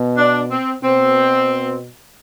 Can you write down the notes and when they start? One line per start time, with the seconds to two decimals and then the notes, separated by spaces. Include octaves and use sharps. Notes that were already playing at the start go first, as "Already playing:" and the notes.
Already playing: B2
0.17 D4
0.50 C4
0.82 B2 C4